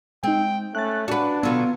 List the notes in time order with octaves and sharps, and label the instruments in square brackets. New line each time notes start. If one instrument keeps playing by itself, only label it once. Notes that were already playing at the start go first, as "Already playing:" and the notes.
[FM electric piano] G#3 D#4 [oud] C4 [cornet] G5
[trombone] A3 [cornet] C#4 [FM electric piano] F#6 A6
[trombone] D4 [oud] F#4 B4
[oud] B2 D3 F#3 [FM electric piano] B3 [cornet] F4